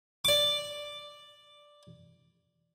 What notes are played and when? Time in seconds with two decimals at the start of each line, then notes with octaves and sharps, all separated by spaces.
0.25 D5 D6